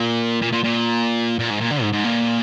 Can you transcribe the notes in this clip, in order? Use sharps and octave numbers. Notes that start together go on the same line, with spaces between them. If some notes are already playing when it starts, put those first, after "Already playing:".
Already playing: A#2
A#2
A#2
A#2
A#2
G#2
A#2
D3
G#2
G#2
A#2